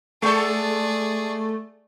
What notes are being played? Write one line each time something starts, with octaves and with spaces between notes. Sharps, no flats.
G#3 A3 G#4 A4 D5